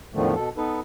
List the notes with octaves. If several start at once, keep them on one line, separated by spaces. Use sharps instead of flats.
E2 A2 D3 D#3 F3 A3
B2 A4
B3 D#4 A4 B4